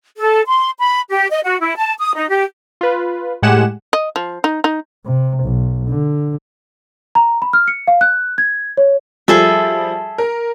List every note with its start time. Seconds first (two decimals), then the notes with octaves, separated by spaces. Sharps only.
0.17 A4
0.46 C6
0.79 B5
1.09 G4
1.31 D#5
1.44 F#4
1.60 E4
1.76 A5
1.98 D#6
2.15 D#4
2.29 G4
2.81 F4 B4
3.42 A2 G#3 G4 F#5 G#5 E7
3.93 D#5
4.16 F3
4.44 D#4
4.64 D#4
5.05 C3
5.44 B1
5.89 D3
7.15 A#5
7.42 B5
7.53 F6
7.68 C#7
7.87 F5
8.01 F#6
8.38 G#6
8.77 C#5
9.28 F3 G3 G#4 A4 E5
10.18 A#4